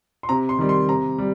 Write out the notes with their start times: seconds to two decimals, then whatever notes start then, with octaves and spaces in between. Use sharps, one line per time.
0.23 C6
0.29 C3 A#5
0.49 C6
0.59 D#3 G3
0.69 C6
0.89 C3 A#5
1.18 G3